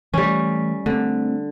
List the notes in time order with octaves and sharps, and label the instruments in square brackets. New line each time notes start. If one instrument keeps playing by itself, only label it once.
[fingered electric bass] E3 A3 [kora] G3 C#4
[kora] D3 [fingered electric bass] A3 C4